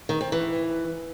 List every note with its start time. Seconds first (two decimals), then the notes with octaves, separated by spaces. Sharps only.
0.09 D#3
0.21 C4
0.32 E3